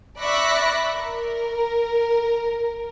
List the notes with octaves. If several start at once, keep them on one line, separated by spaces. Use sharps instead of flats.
D5 E5 B5 C#6 F#6 A#6
A#4